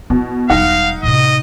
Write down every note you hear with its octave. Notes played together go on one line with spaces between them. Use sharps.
B2 E4
E1 G3 D#4 F5 F#5
A2 C3 D#5